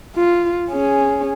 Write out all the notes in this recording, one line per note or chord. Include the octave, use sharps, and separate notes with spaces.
F4
C#4 G#4